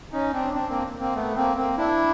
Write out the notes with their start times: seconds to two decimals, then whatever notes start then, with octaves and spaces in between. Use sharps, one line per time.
0.13 C#4 D#4
0.33 C4 D4
0.54 C4 D4
0.69 A#3 C4
1.00 A#3 C4
1.15 A3 B3
1.36 A#3 C4
1.57 A#3 C4
1.77 D4 E4